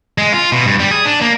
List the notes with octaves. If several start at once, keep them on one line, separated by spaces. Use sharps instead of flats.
G#3
F4
B2
G2
G3
G#4
D4
A#3